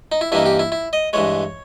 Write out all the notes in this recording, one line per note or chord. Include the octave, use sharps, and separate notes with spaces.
D#4
E4
G2 E3 A#3 D#4 E4
G4
E4
E4
D#5
G2 E3 G#3 C#5